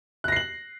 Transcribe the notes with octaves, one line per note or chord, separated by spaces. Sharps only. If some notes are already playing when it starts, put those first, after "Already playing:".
F#6 A#6 C7 F#7